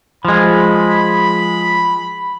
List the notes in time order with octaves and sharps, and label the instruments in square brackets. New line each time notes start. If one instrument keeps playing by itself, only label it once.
[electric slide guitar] F3 G#3 [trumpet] B5